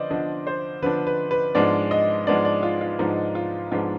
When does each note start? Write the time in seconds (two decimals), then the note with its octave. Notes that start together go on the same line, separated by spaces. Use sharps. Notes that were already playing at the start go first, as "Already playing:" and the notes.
Already playing: D3 F3 B3 C5 D5 D#5
0.10 D3 F3 B3 D4 D#5
0.47 C5
0.82 D3 F3 B3 D4 B4
1.07 B4
1.31 B4
1.55 G#2 F3 G#3 B3 D4 D5
1.91 D#5
2.27 G#2 F3 G#3 B3 D4 D5
2.45 D5
2.63 F4
2.81 F4
2.99 G#2 F3 G#3 B3 D4 D#4
3.35 F4
3.71 G#2 F3 G#3 B3 D4 F4